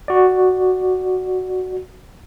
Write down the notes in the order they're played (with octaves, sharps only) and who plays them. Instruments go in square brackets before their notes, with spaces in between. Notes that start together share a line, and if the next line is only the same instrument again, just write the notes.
[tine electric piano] F#4 D5